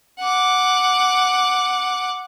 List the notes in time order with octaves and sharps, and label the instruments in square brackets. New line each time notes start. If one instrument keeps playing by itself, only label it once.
[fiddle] F#5 D6